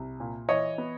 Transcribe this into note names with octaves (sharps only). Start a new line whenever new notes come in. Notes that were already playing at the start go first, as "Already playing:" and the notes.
Already playing: C2
A#2
E3 C#5 D#5
B3